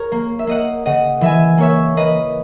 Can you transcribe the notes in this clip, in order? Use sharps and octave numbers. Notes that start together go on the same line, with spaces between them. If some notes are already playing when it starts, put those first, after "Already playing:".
Already playing: G#4 A#4 C#5
A#3
E5
A#3 D#5 F#5
C#3 D#5 F#5
E3 E5 G#5
A#3 C#5 E5
A#3 B4 D#5